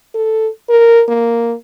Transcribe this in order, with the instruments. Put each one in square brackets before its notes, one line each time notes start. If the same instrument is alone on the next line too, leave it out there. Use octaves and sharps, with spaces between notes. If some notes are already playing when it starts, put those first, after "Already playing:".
[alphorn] A4
A#4
A#3